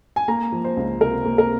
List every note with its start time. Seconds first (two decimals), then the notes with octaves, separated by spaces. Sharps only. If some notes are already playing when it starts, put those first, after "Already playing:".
0.16 G#5
0.28 A#3 A#5
0.52 F3
0.65 C5
0.77 C#2
1.01 C3 A#4
1.26 A#3
1.38 A#4